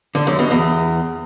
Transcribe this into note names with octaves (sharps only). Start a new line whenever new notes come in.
D3
F#2
B2
E2